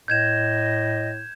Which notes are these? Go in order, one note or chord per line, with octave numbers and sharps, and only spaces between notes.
A2 D#5 G6 G#6 E7